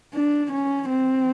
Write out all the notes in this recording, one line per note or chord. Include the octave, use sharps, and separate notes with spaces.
D4
C#4
C4